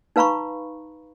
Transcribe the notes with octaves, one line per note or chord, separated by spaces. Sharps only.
D#4 B4 F5 A#5 B5 C#6